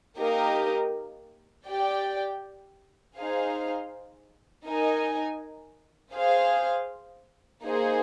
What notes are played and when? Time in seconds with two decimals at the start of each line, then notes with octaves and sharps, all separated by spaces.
0.18 A#3 D#4 G4 A#4 D#5
1.68 G4 D5 G5
3.17 D#4 G#4 C5 F5
4.67 D#4 A#4 D#5 G#5
6.15 G#4 C5 F5
7.65 A#3 D#4 G#4 C5